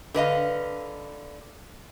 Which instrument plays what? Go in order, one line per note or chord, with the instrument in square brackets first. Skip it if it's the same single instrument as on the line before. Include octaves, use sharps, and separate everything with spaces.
[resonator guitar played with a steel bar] D3 B4 D#5 F5